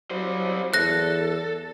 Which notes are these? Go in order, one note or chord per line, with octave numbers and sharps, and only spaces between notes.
F#3 G3 C5
E2 A4 F#6 A#6